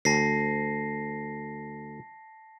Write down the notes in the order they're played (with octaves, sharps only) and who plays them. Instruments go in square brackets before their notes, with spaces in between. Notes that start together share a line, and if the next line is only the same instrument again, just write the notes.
[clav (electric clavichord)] D2 [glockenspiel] A5 A#6 C7